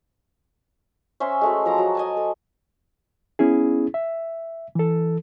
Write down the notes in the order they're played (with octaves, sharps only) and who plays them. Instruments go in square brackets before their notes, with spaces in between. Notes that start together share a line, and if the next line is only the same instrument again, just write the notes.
[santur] C#4 C5 E5 E6
G#3 A3 F#4
F3 A#5 D6
F#3
D#5 G#5 A5
A4
[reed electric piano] B3 C#4 E4 G#4
E5
E3 A4